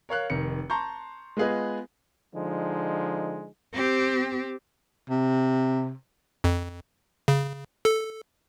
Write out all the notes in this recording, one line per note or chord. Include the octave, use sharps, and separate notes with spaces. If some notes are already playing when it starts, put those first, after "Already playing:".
A#4 C#5 F5 F#6
F1 D#3 C#7
A5 A#5 C6 C#6 G6
G#3 B3 F4 G#4 B4 D#5
D3 F3 G#3 D#4
C4 G4
C3
F2
C#3
A4